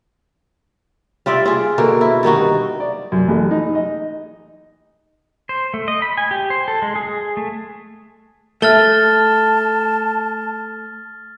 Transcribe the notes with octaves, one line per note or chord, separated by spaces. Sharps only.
G3 F4 D5 E5
F4 G#4
B2 D3 A#3
E4
G2 D#3 D#4 F#4
D5
F#2
A1
D#4
D#5
C5
A3
D#5
B5
G#5
G4
C5
A4
G#3
G#4
G#4
A3
A3 A5 F6 A6 G7